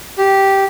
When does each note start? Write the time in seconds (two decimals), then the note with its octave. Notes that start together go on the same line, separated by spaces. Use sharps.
0.18 G4